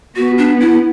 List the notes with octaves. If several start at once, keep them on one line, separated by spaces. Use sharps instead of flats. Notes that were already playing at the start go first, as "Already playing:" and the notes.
B3 F#4
D4
E4